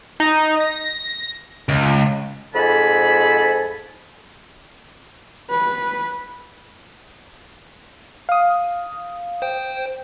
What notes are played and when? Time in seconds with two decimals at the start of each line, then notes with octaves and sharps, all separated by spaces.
0.20 D#4
0.60 A#6
1.69 C#2
2.55 F2 G#2 A4 G#5 A5 B5
5.50 B4
8.29 F5 D#6
9.42 C5 G5